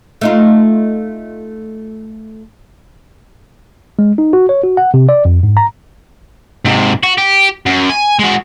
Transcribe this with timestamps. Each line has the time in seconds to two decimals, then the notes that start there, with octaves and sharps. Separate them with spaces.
0.21 A3 D#4 F4
3.99 G#3
4.18 D#4
4.33 F#4
4.49 C#5
4.64 F#4
4.77 F#5
4.94 C3
5.09 D5
5.25 F2
5.43 G#2
5.57 A#5
6.65 G#2 C3
7.03 F#4
7.18 G4
7.66 F#2
7.90 G#5
8.19 G#3 F#4